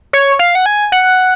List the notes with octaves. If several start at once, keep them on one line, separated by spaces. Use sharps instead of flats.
C#5
F5
F#5
G#5
F#5